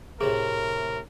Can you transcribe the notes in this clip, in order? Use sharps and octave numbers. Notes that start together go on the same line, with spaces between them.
A2 C3 A3 G#4 A#4